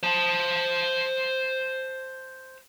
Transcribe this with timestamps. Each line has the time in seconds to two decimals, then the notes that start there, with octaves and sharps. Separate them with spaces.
0.03 C5 A5